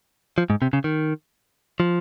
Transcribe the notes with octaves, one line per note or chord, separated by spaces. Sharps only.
F3
G#2
C3
C#3
D#3
F3